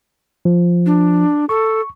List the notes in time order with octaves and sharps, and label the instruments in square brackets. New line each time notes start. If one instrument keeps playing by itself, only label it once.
[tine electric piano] F3
[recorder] D4
[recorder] A4 [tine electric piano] C#6